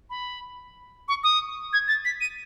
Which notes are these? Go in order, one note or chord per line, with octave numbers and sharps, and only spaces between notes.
B5
C#6
D#6
G#6
A6
B6
D#7